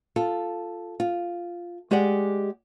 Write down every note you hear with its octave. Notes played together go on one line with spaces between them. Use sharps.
F4 A4
F4
G#3 G4 G#4 D5 F#5